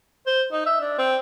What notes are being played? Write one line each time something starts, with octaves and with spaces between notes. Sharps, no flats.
C5
D#4
E5
D4
C4